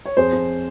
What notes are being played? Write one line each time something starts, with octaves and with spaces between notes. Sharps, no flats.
C#5
F2 G#4 C5
F2